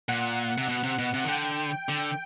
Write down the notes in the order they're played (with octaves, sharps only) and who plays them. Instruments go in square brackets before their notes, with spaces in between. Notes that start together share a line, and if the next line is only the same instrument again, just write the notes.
[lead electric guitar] A#2 [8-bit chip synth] F#5
[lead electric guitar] C3
B2
C3
B2
C3
D#3
[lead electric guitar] D3 [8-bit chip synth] G5
[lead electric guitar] D3